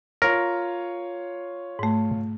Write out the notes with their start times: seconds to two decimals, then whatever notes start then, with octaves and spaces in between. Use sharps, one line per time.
0.22 F4 A#4 C#5
1.79 G#2 A3